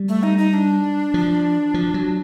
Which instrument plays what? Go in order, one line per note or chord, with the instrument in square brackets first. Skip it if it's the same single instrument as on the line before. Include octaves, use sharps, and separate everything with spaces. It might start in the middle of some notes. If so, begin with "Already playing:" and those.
Already playing: [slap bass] G3
[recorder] A3
D#4
D#4
D4
[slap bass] F3
F3
F#3